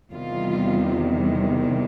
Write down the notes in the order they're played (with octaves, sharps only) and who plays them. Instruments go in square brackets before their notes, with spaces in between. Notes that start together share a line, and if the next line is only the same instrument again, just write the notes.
[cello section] E2 C3 D#3 G3 F4